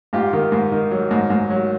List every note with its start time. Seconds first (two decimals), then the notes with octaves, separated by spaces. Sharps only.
0.13 G#2 F4 G4
0.33 D#3
0.52 G#2
0.72 D#3
0.91 F#3
1.11 G#2
1.30 G#2
1.50 F#3